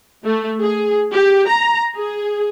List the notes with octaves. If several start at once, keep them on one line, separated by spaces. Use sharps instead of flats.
A3
G#4
G4
A#5
G#4